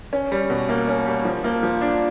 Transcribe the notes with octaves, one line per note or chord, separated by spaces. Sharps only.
C#4
G3
B2
A#3
C#4
G3
F3
A#3
F3
D4